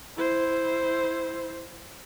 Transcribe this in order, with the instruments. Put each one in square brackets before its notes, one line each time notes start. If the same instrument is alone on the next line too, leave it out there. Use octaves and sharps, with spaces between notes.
[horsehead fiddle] E4 C5